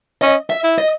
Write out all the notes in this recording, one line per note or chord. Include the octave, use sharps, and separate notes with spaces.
C#4 D#5
E5
E4
D#5